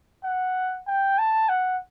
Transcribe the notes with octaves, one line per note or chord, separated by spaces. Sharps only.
F#5
G5
A5
F#5